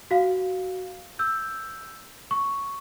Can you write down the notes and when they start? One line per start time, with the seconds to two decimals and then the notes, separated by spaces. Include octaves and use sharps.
0.11 F#4 F5
1.19 E6 G6
2.31 C#6